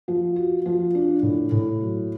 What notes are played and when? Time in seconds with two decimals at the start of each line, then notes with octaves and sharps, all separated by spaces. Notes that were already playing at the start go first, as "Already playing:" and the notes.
0.08 F3
0.36 F#4
0.66 F3
0.95 D4
1.23 A2
1.52 A2
1.80 F#3